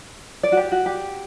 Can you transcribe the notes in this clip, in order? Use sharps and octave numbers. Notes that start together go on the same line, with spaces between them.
D5
F#4
G4
F#4
G4